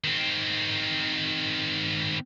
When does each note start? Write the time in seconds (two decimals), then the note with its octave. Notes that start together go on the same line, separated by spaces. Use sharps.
0.04 D#3 C4